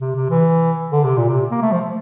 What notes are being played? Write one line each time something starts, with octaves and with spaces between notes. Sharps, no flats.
C3
C3
E3
D3
C3
A#2
C3
A#3
A3
F3